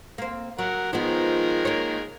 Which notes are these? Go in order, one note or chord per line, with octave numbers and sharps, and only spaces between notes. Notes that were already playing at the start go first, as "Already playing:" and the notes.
A#3 C4
F#3 A#4 F#5
D#3 F3 G#3 B3 A#4
A#3 C#5